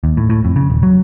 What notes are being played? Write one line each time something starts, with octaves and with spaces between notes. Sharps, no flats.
D#2
A2
A2
F2
C#3
D#1
F#3